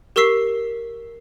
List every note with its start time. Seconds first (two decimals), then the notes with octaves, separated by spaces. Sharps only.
0.16 G4 A#4 C#6 E6 B6 C7